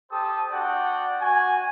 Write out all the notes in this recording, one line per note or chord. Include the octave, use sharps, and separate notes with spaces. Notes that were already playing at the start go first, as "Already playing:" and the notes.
G4 A4 C5 A5 D#6
D4 F#4 D5 F#5 G5
F#4 G#5